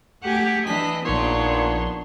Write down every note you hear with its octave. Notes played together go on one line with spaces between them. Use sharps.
A3 G4 F#5 G#5
E3 D4 D#5 B6
A#1 A#2 B3 D4 D#4 C#5 C6